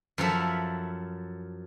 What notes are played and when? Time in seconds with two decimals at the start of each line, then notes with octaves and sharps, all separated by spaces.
0.18 F#2 F3 A4 E5